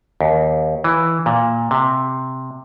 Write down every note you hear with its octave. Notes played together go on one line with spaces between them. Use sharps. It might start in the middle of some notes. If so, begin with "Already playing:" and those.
D#2
E3
A#2
C3